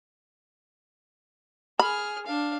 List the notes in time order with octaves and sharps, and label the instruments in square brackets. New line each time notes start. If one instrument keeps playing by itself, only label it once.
[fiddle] G#4 F6 [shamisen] B5
[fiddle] D4 F5